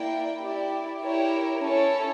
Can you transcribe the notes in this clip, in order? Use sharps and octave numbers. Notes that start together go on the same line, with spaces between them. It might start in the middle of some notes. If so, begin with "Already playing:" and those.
Already playing: A#3 E4 A#4 D5 G5
E4 G4 D5
E4 G4 A#4 C#5
C#4 E4 A4 C#5